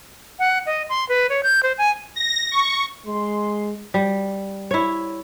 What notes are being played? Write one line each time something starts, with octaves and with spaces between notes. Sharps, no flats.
F#5
D#5
C6
B4
C#5
G6
C5
G#5
A#6
C#6
G#3 C6
G3
E4 C#5